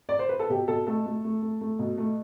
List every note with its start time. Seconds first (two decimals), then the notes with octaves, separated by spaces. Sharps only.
0.09 D5
0.19 C5
0.29 B4
0.40 A4
0.49 B2 G4
0.68 B2 A4
0.87 A3 A4
1.06 A3
1.24 A3
1.42 A3
1.61 A3
1.79 B2
1.98 A3